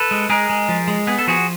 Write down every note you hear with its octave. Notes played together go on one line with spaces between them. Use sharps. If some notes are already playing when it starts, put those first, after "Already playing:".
Already playing: A4 B4
G#3
G#3 G#4 A#4
G#3
F3
G#3
B3 G#4
A4
F3 F#4 G#4